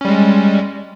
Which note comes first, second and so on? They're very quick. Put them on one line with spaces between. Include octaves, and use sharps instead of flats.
C#4 G3 G#3